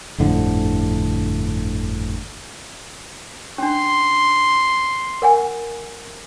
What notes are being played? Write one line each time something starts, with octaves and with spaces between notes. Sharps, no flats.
G1 F2 A2 D3
C#4 D4 C6
A#4 F#5 G#5